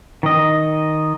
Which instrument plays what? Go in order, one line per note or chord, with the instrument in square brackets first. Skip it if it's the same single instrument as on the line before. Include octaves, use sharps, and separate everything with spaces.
[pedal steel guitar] D#3 D#5